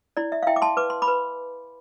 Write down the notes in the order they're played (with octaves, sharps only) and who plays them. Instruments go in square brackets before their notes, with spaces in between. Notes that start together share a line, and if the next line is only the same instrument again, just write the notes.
[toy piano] E4 D5
E5
F5
E4 E5 G5
D6
A5 C6
B4 D6
C6
B5 D6
B4